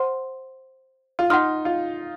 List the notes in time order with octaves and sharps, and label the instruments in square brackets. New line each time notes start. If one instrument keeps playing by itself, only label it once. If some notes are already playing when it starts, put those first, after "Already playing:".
Already playing: [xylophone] C5 F#5 C6
[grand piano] F4
[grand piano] D#4 [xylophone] F#5 C6 F6
[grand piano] F4